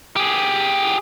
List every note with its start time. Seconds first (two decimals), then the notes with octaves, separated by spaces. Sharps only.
0.16 G4 G#4